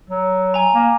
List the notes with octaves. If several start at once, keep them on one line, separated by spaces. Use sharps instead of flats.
F#3
G#5 A#5
A#3